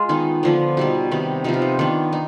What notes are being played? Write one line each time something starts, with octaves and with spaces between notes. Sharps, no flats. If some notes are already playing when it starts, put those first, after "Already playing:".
Already playing: G#3 F4
D#3 B3 D#4
D3 F3 B3 D4
B2 G3 B3 D#4
C3 D#3 B3
C3 F3 B3 D#4
F4
D#4
D#3 B3 D4
D#4